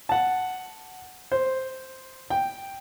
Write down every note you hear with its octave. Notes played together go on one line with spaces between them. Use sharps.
F#5 A5
C5
G5